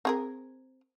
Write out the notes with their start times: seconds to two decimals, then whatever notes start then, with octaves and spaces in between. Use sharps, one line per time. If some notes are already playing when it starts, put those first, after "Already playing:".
0.05 C4 G#4 A#4